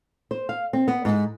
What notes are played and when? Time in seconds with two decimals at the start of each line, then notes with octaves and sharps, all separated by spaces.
0.31 C5
0.49 F5
0.73 C4
0.88 B3
1.05 G#2